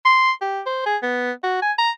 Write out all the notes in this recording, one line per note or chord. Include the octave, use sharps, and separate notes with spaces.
C6
G4
C5
G#4
B3
F#4
G#5
A#5